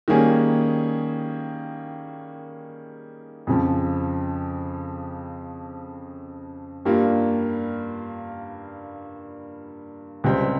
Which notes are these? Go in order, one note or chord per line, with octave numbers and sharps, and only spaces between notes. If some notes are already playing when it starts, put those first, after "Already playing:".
D#3 G3 A#3 C#4 G#4
F2 C#3 F3
G2 G3 A#3 F4
C#2 C3 G3 C4